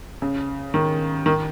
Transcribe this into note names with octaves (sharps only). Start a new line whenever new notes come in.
C#3
D#3
D#3